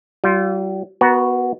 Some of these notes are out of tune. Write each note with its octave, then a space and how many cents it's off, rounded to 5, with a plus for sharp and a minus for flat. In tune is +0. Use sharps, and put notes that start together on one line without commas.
G3 -40 F4 +0
B3 +0 F#4 +0 A#4 +35